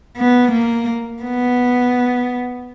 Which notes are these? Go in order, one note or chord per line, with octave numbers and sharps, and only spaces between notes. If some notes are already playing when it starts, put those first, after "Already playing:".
B3
A#3
B3